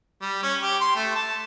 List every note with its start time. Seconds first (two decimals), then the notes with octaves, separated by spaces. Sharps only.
0.21 G3
0.43 C#4
0.62 G4
0.81 C6
0.95 A3
1.15 A5